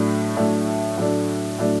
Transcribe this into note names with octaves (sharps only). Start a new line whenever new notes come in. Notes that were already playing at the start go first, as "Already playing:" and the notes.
Already playing: A2 F#3 A3 D4
A2 F#3 A3 D4
A2 F#3 A3 D4
A2 F#3 A3 D4